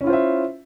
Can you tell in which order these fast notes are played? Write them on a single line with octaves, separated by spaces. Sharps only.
C#4 E4 F4 C5 E5